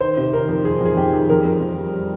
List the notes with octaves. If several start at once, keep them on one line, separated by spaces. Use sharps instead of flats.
D#3 C5
C3
D#3 A#4
F2
D#3 G#4
F2 G#4
F2 G4
D#3
F2 A#4
F2
F2
G3
G3